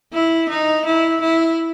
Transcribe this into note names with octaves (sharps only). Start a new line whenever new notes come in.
E4
D#4
E4
E4